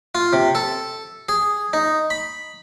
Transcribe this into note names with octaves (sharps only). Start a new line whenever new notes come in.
F4
C3
A4
G#4
D#4
B5